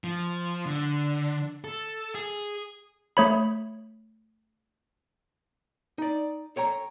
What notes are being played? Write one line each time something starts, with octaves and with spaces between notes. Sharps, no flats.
F3
D3
A4
G#4
A3 C#5 B5
D#4 D5
A4 C#5 G5 A#5